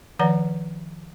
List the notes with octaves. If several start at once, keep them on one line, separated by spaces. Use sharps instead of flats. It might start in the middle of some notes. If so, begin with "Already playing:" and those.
D#3 F3 B4 D5 F#5 A#5